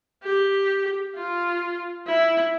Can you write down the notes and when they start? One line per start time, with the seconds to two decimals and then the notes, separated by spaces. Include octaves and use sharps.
0.23 G4
1.15 F4
2.07 E4